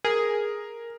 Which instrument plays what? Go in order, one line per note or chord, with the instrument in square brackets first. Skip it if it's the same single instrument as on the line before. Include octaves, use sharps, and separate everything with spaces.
[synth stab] G#4 [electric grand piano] A#4